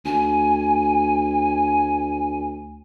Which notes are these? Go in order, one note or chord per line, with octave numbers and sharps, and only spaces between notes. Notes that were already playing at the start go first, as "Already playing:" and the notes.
D2 G#5